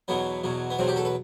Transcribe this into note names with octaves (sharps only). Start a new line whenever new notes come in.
E2 B2 F#3 B3
E2 B2 F#3
B3
E2 B2 F#3 C4
G4
A4
B4